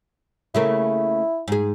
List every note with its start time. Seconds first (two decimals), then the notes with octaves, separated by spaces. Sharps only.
0.55 C#3 A3 A#3 E4
1.48 G#2 G#4